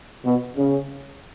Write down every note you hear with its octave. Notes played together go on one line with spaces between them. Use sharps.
B2
C#3